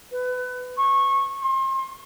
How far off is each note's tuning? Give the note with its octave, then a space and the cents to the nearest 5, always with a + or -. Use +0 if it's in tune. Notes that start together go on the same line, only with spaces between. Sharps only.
B4 +25
C#6 -20
C6 +35